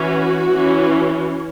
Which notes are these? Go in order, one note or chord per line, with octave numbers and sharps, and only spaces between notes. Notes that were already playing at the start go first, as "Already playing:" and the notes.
Already playing: E3 C#4 F#4
E3 C#4